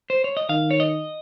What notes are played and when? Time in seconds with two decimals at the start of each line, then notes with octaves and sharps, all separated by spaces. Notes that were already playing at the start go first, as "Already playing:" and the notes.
0.10 C5
0.24 C#5
0.37 D#5
0.49 D#3 F5
0.71 C#5
0.80 D#5